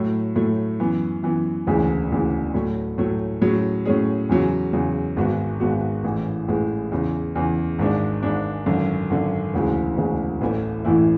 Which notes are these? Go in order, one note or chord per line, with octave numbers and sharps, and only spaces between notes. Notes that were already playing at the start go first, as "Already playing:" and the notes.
Already playing: A2 F#3 A3
A2 F#3 A3
F#2 E3 B3
F#2 E3 B3
E1 D2 C#3 E3 G#3
E1 D2 C#3 E3 G#3
A2 F#3 A3
A2 F#3 A3
A2 F#3 C#4 G#4
A2 F#3 C#4 G#4
E2 C#3 F#3
E2 C#3 F#3
G#1 G#2 G#3 B3 F#4
G#1 G#2 G#3 B3 F#4
A1 A2 E3 G#3
A1 A2 E3 G#3
E2 C#3 E3
E2 C#3 E3
G#1 G#2 G#3 D4
G#1 G#2 G#3 D4
G#1 F#2 D3
G#1 F#2 D3
E1 D2 C#3 G#3
E1 D2 C#3 G#3
A1 A2 E3 A3 E4
A1 A2 E3 A3 E4